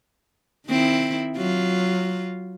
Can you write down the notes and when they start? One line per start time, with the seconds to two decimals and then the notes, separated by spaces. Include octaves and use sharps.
0.67 D#3 C4 E4
1.37 F#3 F4